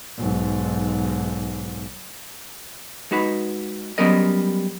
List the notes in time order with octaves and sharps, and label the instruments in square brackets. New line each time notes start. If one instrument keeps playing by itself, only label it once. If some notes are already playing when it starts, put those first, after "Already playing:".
[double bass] B1 G#2
[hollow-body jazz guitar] G#3 D#4 F#4 B4
F#3 G3 B3 C#4 A#4 D#5